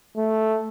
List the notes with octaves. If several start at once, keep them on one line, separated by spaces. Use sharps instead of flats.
A3